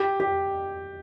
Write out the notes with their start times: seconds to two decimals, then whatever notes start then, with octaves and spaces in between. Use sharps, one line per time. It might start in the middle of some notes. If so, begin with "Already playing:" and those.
Already playing: G4
0.20 G4